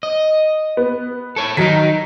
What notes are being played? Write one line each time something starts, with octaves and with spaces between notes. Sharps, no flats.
D#5
B3
A4 C#5
D#3 F#3 D#4 B6